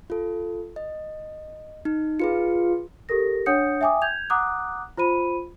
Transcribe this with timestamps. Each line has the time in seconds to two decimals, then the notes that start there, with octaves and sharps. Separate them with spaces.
0.10 F4 A4
0.76 D#5
1.85 D#4
2.20 F4 G#4 B4 C#7
3.09 G4 A4 A#4 A#6
3.46 D4 C#5 F#5 D#6 G6 C#7
3.81 E5 G5 G#5 D6 D#6
4.02 G6 G#6 F7
4.30 F#5 A#5 D6 D#6 F#6
4.98 F4 C5 B5 D#7